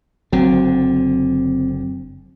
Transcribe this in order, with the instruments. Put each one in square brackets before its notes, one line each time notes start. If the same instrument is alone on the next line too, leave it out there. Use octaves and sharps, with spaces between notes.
[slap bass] F#1 D3 [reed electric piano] F#3 [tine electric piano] C4